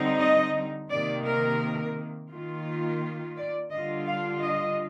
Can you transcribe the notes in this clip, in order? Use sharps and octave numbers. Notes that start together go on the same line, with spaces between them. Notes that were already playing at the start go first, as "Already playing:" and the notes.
Already playing: D3 G3 C4 D#4
D#5
C3 D#3 A#3 D5
A#4
D#3 A#3 F4
D5
D3 G3 D4 F4 D#5
F5
D#5